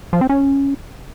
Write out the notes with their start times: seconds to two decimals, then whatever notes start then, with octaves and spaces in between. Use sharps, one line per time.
0.13 F3
0.21 C4
0.30 C#4